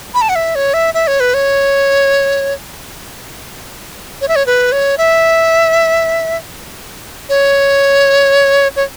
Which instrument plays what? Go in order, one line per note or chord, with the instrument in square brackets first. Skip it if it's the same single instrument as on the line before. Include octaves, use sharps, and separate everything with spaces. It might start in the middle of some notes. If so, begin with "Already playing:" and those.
[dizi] B5
A5
F#5
E5
C#5
E5
E5
C#5
B4
C#5
C#5
E5
C#5
B4
C#5
E5
C#5
C#5